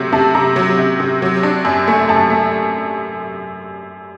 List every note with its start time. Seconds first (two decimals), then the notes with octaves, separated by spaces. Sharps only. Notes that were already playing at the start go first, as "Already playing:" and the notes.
Already playing: C3 F#3 A3
0.12 C3 A5
0.35 C3 A#5
0.56 F#3
0.78 C3
1.00 C3
1.22 F#3
1.43 D4
1.65 F#2
1.88 A3
2.09 F#2 A5
2.30 A3